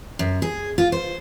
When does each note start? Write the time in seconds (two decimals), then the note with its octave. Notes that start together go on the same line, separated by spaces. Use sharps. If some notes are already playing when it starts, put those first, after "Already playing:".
0.19 F#2
0.42 G#4
0.78 F4
0.92 C5